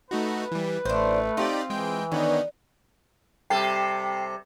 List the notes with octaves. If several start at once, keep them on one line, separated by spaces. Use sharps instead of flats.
A3 D#4 F#4 B4
E3 G3
A1 A3 D4 C5
C4 D#4 F4 G4 D5
E3 G#3 G5
D3 D#3 B3 D4 D#4 C#5
C3 G3 A4 G5 C7